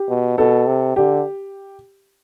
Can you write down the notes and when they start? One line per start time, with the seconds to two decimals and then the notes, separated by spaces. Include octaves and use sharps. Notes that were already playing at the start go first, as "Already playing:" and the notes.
Already playing: G4
0.09 B2
0.38 B2 A4
0.67 C3
0.96 D3 G4